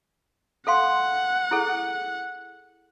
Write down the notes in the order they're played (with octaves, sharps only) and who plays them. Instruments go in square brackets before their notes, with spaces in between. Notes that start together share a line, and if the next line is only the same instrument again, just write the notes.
[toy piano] A4 F5 C6 [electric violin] F#5
[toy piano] E4 G#4 A4